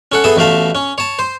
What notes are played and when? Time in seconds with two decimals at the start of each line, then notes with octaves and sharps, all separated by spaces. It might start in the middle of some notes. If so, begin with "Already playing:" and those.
0.12 C#4 A4 F#5
0.24 B3 G#4 A4 E5 A5
0.36 A1 B2 A3 F5 A5
0.75 C#4
0.98 C#5 A5
1.19 C5